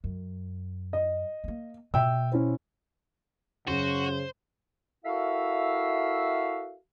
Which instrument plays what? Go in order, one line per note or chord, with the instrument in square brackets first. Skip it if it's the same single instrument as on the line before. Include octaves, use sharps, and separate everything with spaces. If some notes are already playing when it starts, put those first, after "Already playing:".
[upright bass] F#2
[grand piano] D#5
[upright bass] A#3 B3
[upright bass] B2 [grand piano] E5 G5 E6
[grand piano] C#4 E4 C5
[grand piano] F#2 [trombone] C#3 [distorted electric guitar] F#4 [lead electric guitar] C5
[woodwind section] E4 F#4 A4 A#4 E5 F5